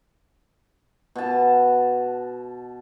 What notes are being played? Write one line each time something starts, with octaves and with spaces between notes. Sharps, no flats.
B2 A5